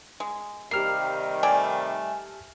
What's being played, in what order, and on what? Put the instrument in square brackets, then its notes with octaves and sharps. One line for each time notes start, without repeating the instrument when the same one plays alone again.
[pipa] G#3
[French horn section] C3 D#3 G3 [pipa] A#3 [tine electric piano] G4 F6 C7
[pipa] A3 D5 [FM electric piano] G#5